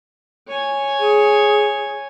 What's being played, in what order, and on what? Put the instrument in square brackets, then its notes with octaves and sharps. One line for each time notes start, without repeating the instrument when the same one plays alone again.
[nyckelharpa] C#5 G#5
[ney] G#4